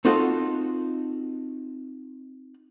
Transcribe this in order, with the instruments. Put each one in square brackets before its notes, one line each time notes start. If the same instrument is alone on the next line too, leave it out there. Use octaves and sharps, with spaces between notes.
[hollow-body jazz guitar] C4 D#4 F4 F#4 A4